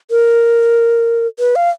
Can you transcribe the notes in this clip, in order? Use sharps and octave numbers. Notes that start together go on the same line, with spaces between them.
A#4
B4
F5